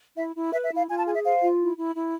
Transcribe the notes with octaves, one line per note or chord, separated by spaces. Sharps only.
E4 E5
E4
B4 E5
E5
E4
F5
F4 G#5
A5
G#4 G#5
E5
C5 F5
F4
E4
E4
E4